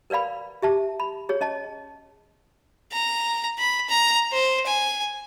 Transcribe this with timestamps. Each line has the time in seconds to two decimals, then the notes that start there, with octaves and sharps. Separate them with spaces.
0.10 A#4 B4 D5 F5 B5
0.62 G4 E5 A5
1.00 B5
1.29 G#4 C#5
1.41 C#4 D#5 A5
2.92 A#5
3.59 B5
3.89 A#5
4.32 C5
4.66 G#5